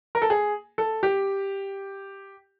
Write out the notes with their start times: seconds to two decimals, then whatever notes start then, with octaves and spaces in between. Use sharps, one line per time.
0.15 A#4
0.22 A4
0.30 G#4
0.78 A4
1.03 G4